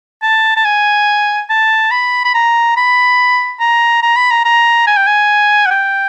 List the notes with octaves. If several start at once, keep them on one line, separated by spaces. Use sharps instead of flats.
A5
A5
G#5
A5
B5
B5
A#5
B5
A#5
A#5
B5
A#5
A#5
G#5
G5
G#5
F#5
G5